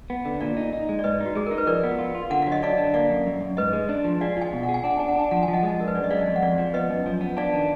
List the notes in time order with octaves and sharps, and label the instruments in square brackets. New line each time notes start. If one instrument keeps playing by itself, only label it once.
[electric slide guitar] B3
D3
[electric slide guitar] A#2 [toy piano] D5 F5
[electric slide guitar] D#4
D#4
G#3
[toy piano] D5
[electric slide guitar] G#2 [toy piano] B4 D#5
[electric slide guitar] D#4
[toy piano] F#4
[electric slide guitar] G#3 [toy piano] G#4
[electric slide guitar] D#4 [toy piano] A#4
[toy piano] B4
[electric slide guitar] F3 [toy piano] A#4 D5
[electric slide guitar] B3
F4
F4
[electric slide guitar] D3 [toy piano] F#5
[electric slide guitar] F#3 [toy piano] F5
[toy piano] D#5
[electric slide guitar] D4 [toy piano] D5 F5
[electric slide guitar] D3
[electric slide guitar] A#3 [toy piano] D5 F5
[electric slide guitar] F#2
F#2
F#2
[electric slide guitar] G#2 [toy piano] B4 D#5
[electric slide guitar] G#3
D4
F3
[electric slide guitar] G#4 [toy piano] D5 F5
[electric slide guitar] F4 [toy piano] F5 G#5
[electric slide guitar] B2
[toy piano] F#5
[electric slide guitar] G#4
[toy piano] G#5
[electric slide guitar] D4 [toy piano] F#5
[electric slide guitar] D4 [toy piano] G#5
[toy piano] F#5
[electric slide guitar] D4 [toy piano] G#5
[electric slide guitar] F3 [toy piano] F#5
[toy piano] G#5
[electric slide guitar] F3
[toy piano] D#5 F#5
[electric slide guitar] G#3
[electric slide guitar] D4 [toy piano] A#4
[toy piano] B4
[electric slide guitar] F#2 [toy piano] D5
[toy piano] D#5
[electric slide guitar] G#3 [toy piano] D5 F5
[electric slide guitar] F2
[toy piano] F#5
[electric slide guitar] F2 [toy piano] D5 F5
[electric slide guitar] F3
[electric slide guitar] B3 [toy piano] B4 D#5
[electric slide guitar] F#2
F3
B3
[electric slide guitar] D4 [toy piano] D5 F5
[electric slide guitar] D#3